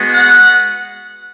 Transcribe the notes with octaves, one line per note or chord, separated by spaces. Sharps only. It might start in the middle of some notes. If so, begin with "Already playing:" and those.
Already playing: G#3 B3 F#4
F#5